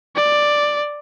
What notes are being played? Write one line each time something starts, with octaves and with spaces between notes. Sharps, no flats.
D5